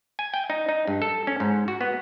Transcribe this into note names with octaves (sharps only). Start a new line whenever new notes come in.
G#5
G5
D#4
D#4
G2
A4
C#4
G#2
F#4
B3